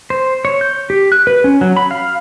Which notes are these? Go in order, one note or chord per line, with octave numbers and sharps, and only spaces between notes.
C5
C#5
G6
G4
F#6
B4
C#4
F#3
B5
F5